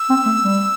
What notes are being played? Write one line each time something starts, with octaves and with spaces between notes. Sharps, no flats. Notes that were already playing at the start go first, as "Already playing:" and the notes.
Already playing: E6
C4
A3
G3